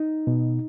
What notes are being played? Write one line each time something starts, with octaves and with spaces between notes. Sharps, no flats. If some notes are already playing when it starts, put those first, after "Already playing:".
Already playing: D#4
B2